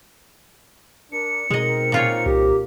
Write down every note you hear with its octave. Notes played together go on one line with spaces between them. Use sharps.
D4 A#4 C#7
B2 G#3 C4 D#4 A#4 D#5
A#2 F4 C#5
C2 G4